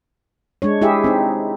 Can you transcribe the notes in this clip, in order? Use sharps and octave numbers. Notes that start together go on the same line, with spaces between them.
G#3 D4 C#5
E4 G4 G#4 E5
C4 D#4